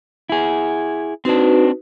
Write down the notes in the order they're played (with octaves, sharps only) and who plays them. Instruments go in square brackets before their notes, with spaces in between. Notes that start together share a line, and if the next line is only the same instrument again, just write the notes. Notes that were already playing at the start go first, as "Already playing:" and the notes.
[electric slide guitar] E4 G#4
[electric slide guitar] C4 D4 [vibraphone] D#4 F#4 B4